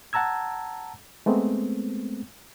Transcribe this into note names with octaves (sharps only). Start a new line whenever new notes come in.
F#5 A5 A#5 E6 G#6
G#3 A3 B3 C4